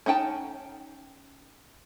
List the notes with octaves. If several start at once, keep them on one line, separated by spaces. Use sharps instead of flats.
C#4 D#4 F#5 G5 A5